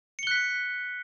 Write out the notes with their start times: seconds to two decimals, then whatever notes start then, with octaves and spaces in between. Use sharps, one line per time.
0.19 C#7
0.23 G7
0.27 F#6
0.31 B6